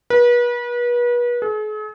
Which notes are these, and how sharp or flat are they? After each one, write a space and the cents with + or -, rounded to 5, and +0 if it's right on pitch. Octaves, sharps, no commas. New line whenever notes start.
B4 -35
G#4 +45